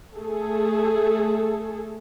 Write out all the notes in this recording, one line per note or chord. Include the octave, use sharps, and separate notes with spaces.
A3 G#4 A4